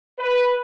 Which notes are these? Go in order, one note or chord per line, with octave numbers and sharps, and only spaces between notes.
B4